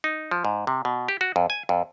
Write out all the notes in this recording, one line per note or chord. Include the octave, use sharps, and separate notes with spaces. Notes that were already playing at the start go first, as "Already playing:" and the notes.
D#4
F3
G#2
C3
B2
G4
F#4
F2
G#5
F2